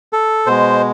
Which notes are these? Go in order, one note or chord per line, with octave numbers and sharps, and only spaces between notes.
A4
B2 G#3 C5